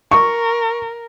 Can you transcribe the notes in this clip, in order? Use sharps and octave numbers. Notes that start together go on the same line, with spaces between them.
A#4 C#6